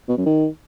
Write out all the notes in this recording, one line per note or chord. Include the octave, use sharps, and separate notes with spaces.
B2
F#2
D#3